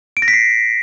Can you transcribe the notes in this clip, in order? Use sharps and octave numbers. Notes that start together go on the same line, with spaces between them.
D7
A#6
B6
C7